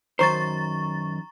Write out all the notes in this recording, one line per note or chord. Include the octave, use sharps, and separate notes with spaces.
F#2 D#3 C5 A#5 C#6 A6